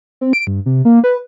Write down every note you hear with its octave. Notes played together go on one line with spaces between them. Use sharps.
C4
D7
G2
C3
A#3
B4